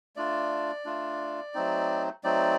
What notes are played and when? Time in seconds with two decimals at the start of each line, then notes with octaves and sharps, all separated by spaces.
0.16 A3 D4 F4 D5
0.85 A3 D4 F4
1.54 F#3 A3 C4 D#4
2.24 F#3 A3 C4 D#4 D5